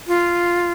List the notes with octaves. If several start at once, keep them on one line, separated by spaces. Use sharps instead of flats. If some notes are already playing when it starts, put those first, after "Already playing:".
F4